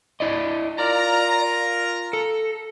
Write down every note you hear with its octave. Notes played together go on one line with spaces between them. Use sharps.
E4 D5 D#5
F4 A#4 D5 A#5
A4